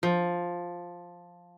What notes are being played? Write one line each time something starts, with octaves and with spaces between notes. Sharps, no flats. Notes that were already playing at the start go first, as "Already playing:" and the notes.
F3